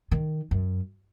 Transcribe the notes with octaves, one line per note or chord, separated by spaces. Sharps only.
D#3
F#2